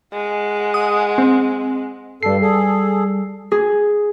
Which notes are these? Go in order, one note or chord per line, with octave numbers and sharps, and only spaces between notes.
G#3 F#5
D#6
C4
G2 G3 A4 C7
G#4 A4
G#4